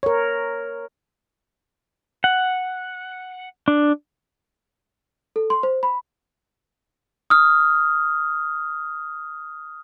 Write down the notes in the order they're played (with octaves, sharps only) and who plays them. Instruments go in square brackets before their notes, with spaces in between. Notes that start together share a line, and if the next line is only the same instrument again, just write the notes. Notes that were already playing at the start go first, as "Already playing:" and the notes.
[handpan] A#4 C#5
[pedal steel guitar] F#5
D4
[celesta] A4
C6
C5
B5
[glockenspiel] D#6 F6